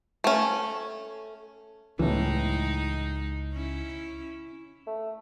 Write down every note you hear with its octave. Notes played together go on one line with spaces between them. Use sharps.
A3 C#4
C#2 A2 E3 G#3 D#4
C#4 E4
A3